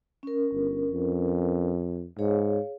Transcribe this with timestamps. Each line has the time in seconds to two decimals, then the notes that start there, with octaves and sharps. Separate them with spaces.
0.23 C#4 A#4
0.53 G1
0.92 F2
2.19 G#2 G#4 C#5 F5